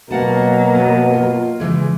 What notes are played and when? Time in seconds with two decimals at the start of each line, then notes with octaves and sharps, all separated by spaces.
0.11 B2 F#3 A#3 F5 F#5 A5
0.75 B3
1.13 F4
1.60 C#3 E3 G#3